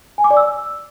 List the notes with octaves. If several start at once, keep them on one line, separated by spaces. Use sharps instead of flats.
G#5
D6
D5
E6